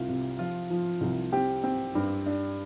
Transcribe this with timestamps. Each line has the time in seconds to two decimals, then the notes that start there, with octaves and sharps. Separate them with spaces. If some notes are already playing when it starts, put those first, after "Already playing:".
Already playing: C2 F4
0.08 C3
0.39 F3 F4
0.70 F3
1.01 C2
1.33 C4 G4
1.64 C4
1.95 G2
2.26 D4